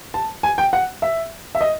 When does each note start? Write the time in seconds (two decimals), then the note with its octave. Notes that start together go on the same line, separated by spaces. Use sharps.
0.14 A5
0.43 G#5
0.58 G5
0.73 F#5
1.02 E5
1.55 E5
1.61 D#5